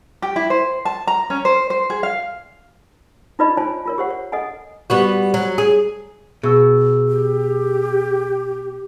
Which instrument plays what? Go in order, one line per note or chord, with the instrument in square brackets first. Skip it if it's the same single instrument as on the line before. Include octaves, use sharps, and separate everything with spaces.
[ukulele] G4
E4
C5
A5
A#5
C#4
C5
C5
G#4
F5
[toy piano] D#4 F4 B4 D5 D#5 B5
F4 C5 C#5 G#5 A5
F4 A#4 C#5
G4 C5 F#5
C#5
A4 D#5 F#5 G#5
[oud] G3 B3 F#4
F#3
G#4
[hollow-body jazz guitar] B2 [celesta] G#4 E6
[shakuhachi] G4